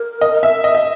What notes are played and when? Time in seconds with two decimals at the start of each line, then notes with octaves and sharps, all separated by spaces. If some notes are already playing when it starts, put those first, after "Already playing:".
Already playing: A#4
0.21 D#5
0.43 E5
0.64 D#5
0.75 E5